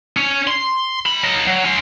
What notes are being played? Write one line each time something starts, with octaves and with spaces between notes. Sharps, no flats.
C#4
C6
G#3 B5
F#3 D#5
F#3
C#4 C6